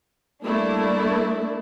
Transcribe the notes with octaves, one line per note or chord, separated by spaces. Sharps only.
G3 A3 A#3 D4 E4